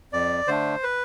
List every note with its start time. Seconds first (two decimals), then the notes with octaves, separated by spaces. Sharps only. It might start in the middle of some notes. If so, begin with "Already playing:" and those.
0.13 F2 D5
0.48 D3 A3 D4 C5
0.83 B4